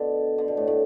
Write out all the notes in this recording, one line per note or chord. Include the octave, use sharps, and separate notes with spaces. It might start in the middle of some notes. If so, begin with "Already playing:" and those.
Already playing: B2 D3
D3
B2
A2
A2